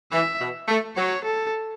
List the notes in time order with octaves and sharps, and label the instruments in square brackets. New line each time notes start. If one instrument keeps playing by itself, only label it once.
[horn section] E3 [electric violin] E5
[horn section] B2
A3
[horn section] F#3 [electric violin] C#5
[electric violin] A4